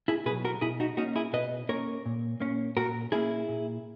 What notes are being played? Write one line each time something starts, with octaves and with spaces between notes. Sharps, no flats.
E4 G#4
B2 F#3 G#4 B4
F#4 A#4
B2 E4 G#4
D#4 F#4
A#3 C#4 D#4 F#4
E4 G#4
B2 B4 D#5
A#3 C#4 A#4 C#5
A#2
A#3 C#4
A#2 F#4 A#4
A#3 C#4 E4 G#4
A#2